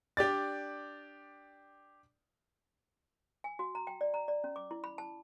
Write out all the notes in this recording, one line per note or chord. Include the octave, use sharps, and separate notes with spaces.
D4 G4 D5 A6
G#5
F#4
A#5
G5
D5
A#5
D5
C#4
D6
E4
B5
A5